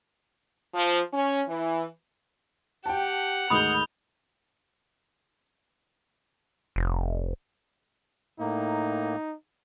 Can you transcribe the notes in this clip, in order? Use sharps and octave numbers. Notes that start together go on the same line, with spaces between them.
F3
C#4
E3
G4 F#5 G5 A5
D2 G#2 D#3 B5 D#6 F6 G6
F1
A2 A#3 D#4